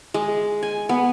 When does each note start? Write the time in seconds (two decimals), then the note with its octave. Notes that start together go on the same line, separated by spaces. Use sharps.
0.14 G#3
0.63 G#5
0.89 B3